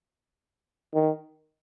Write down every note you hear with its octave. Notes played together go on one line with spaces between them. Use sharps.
D#3